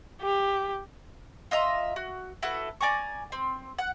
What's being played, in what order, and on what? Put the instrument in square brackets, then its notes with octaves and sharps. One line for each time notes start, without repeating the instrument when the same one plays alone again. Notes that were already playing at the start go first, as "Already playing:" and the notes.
[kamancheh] G4
[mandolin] F4 D#5 E5 A#5
F#4
E4 F#4 A4 B4
D5 G#5 A#5 C#6
C4
F#5